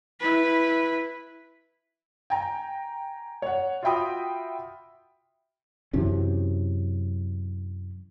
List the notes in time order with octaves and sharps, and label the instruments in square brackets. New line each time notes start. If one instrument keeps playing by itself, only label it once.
[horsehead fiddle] E4 B4
[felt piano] G5 G#5 A#5
C#5 F#5
F4 F#4 E5 G5 B5 D#6
[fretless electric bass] F#2 C3 E3 C#4